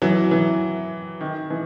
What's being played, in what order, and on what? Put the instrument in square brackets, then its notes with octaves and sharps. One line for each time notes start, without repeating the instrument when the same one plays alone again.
[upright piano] E3 F#3
E3
D#3
E3